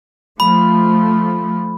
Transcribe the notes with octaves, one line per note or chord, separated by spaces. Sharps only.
F3 A3 B5